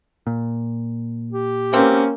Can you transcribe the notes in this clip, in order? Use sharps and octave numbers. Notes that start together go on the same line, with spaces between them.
A#2
G4
B2 A#3 C4 C#4